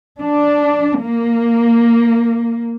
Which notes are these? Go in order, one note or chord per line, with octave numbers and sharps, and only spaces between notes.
D4
A#3